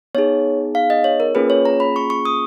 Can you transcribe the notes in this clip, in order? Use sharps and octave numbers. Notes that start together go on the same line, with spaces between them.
B3 D#4 G#4 C#5
F5
D#5
C#5
A#4
A#3 C#4 F4 G#4 B4
C#5
A#5
B5
C#6
C#6
D#6